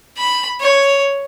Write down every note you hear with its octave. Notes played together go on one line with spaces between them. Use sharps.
B5
C#5